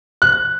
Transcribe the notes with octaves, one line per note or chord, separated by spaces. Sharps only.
F#6